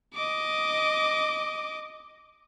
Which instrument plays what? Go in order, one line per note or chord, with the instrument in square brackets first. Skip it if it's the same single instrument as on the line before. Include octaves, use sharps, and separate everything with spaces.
[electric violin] D#5 D6